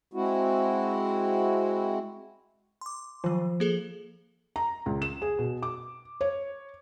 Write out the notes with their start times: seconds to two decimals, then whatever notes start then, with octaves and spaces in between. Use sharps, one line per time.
0.14 G#3 C4 E4 F#4
2.81 C6 D6
3.24 D#3 F3 F#3
3.60 A#3 G#4 A4
4.56 A#5
4.86 C#2
5.02 E7
5.22 G#4
5.39 B2
5.63 D6
6.21 C#5